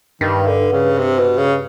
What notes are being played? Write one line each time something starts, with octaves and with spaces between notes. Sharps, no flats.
G2 D#3
D3
C#3
C3
B2
C#3